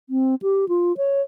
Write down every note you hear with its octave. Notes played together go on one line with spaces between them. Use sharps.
C4
G4
F4
C#5